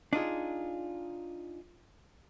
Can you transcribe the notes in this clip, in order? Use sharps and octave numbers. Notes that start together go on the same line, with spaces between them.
D4 D#4 F4 G#4